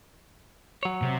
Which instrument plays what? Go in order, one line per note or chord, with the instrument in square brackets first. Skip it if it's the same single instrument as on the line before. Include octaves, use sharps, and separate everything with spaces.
[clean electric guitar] F#3 C#5
[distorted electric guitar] C3